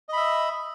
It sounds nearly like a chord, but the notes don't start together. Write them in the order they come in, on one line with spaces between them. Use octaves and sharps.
D#5 B5 E5